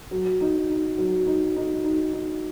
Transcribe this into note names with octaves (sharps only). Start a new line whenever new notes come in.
F#3
D#4
D#4
F#3
D#4
D#4
D#4
D#4